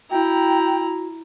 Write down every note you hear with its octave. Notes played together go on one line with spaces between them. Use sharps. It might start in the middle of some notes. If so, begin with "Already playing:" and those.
E4 F#4 G5 A#5